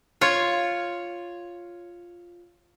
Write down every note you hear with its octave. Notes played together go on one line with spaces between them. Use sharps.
F4 C#5